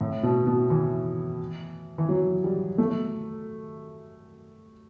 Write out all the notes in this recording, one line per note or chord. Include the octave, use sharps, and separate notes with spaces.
A2
B2
B2
E3
E3
F#3
G3
A3